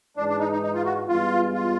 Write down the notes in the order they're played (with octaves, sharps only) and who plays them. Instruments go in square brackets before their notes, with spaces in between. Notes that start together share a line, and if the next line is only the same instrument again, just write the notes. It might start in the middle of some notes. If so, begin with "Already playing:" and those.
[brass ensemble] G#2 E3 G#3 [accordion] D4
[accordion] D4
D#4
D#4
D#4
F4
F#4
[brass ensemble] G2 E3 G#3 B3 [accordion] F4
[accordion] F4